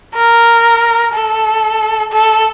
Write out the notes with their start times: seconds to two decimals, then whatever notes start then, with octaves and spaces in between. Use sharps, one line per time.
0.15 A#4
1.14 A4
2.12 A4